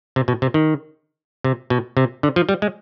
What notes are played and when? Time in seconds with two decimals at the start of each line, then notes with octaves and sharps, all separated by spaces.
0.16 C3
0.28 B2
0.42 C3
0.54 D#3
1.44 C3
1.70 B2
1.97 C3
2.23 D3
2.36 F3
2.49 G3
2.62 G#3